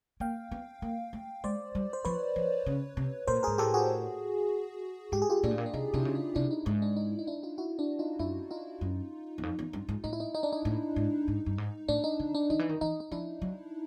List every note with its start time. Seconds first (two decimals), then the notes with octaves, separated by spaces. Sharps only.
0.20 A#3 F5 G5
0.51 B3
0.82 A#3
1.13 A3
1.44 G#3 C5 D5
1.75 G3
1.93 C5
2.05 F3 B4 C#5
2.36 F3
2.66 C#3
2.97 C3
3.27 A#2 A#4 C5
3.43 G#2 G#4 A#4
3.58 A2 G4 A4
3.74 F#4 G#4
5.12 G#2 G4
5.22 G#4
5.30 F4 G4
5.43 A#2 D4
5.51 A2
5.58 A#2
5.66 D4
5.73 C3 D#4
5.94 C3 D4 E4
6.05 C#3
6.15 D4
6.35 C3 D4 E4
6.51 D#4
6.66 G#2
6.82 D4
6.96 D#4
7.19 D#4
7.27 D4 E4
7.43 D#4 F4
7.58 E4 F#4
7.79 D4 E4
7.99 D#4 F4
8.19 F#2 D4 E4
8.51 D#4 F4
8.81 F#2
9.38 E2
9.43 F2
9.59 E2
9.73 G2
9.89 G#2
10.04 A2 D#4
10.13 E4
10.20 D#4
10.34 D#4
10.43 D4
10.53 D#4
10.65 A2
10.96 G#2
11.28 G#2
11.46 G2
11.58 G#2
11.88 A2 D4
12.04 D#4
12.20 D3
12.35 D4
12.50 D#3 D#4
12.59 E3
12.69 D#3
12.81 E3 D#4
13.00 D#4
13.12 F3 D4 E4
13.42 F#3